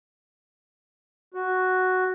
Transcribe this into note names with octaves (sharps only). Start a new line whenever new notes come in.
F#4